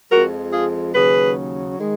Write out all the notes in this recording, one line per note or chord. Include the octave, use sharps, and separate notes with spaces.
F2 F3 G#3 F#4 A#4
F4 G#4
D#2 C#3 F#3 G#4 B4
D#3 G#3